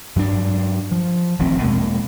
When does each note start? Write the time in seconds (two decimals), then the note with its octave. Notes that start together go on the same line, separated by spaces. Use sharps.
0.16 G2 F#3 C4 D4
0.91 F3
1.39 D#1 A1 F3 C4
1.62 E2 B2 G#3 A#3